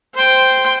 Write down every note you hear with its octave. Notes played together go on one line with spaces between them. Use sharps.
C5 G5